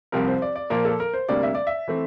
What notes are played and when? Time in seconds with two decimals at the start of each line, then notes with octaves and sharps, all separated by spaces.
0.12 C2 C3 F3 C4 A#4
0.28 C5
0.42 D5
0.56 D5
0.70 A#2 F3 A#3 A#4
0.85 A4
1.00 A#4
1.14 C5
1.29 D2 C3 G3 A#3 D5
1.43 E5
1.55 D5
1.67 E5
1.88 E3 A3 C4